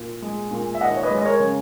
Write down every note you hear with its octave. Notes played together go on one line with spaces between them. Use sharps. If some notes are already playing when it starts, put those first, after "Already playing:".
Already playing: A#2
G#3
A#2
E5
D#2 D#5 F#5
C#5
B4 D#5
G#3
D#5
A#4 C#5
C#3